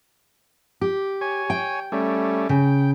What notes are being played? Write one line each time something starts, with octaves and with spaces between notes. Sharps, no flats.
G4
C#5 G#5
G5
G3 A3 C#4
C#3 G5